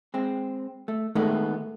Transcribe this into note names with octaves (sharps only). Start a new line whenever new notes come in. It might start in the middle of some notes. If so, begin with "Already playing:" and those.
G#3 C4
A3
D#3 G#3 A3 B3